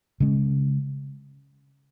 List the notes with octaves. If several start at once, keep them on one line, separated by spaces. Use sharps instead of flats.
C#3 G#3 C#4